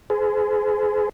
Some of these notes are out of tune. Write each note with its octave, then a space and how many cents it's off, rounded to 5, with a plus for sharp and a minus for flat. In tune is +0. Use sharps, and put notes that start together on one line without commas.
G#4 +25 C5 -40